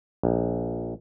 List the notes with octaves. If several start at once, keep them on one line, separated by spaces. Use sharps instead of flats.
A#1